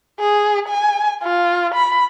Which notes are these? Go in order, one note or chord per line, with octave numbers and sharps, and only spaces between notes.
G#4
G#5
F4
B5